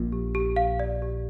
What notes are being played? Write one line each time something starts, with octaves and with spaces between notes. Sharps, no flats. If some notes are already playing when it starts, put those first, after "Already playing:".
Already playing: A#1 A#2
G4
G4
F5
D5
G4